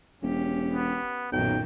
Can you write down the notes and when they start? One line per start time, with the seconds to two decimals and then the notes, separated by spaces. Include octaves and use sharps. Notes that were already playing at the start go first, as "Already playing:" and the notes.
0.22 E1 C#4 G4
0.73 B3
1.32 B1 F#2 A#2 D#3 G5